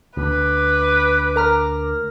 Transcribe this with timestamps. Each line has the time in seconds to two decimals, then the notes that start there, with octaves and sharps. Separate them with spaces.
0.17 D2 B4 D6
1.36 A#4 A#5 F6